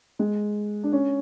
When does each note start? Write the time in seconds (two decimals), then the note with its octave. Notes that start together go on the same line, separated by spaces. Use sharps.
0.19 G#3
0.84 D4
0.93 C#4